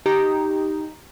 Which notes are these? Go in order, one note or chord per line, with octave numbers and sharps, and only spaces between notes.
D#4 G4 A#5